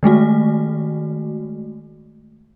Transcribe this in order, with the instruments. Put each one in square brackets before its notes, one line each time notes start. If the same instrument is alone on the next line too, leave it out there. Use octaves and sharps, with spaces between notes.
[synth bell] D#3 G#3 A3 F#4